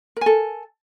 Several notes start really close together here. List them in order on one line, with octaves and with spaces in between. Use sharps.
A#4 G#5 A4